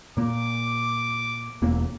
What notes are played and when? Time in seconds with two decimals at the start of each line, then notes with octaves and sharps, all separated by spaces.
0.17 A#2 A#3 D6
1.62 E1 A#3